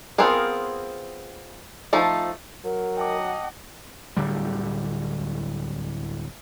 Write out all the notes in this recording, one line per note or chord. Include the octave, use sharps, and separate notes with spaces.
B3 C4 F4 G#4 A#4
F3 A3 D#4 A4
F#3 A#4
D#5 F#5 G5 A5 D6
D1 D3 G3